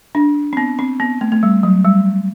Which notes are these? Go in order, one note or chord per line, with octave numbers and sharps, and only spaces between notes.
D4
C4
B3
C4
B3
A3
A3
G3
F#3
G3